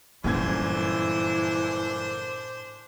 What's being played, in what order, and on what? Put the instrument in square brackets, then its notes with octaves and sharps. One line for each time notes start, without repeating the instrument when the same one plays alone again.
[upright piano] G1 F#2 G#6 [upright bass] A#2 [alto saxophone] E3 [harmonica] D4 C5